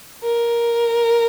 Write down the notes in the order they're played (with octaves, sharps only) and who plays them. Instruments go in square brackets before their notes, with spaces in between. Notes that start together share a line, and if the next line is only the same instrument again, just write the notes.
[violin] A#4